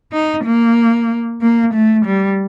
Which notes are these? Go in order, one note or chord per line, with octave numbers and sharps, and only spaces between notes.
D#4
A#3
A#3
A3
G3